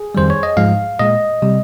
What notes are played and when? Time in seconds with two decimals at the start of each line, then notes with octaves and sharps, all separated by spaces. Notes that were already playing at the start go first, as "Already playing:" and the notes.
Already playing: G#4
0.15 F2 D#3 G3 C5
0.30 C#5
0.43 D#5
0.57 G#2 F3 G#3 F5
0.99 A#2 G#3 D#5
1.42 C3 G3